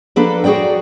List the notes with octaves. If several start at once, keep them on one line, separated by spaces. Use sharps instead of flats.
F3 A#3 D4 A4 B4
F#4 G#4 C#5 D5 G5